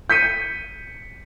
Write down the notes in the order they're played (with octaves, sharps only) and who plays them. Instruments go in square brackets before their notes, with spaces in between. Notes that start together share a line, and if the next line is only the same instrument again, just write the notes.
[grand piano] G6 B6 C#7 D#7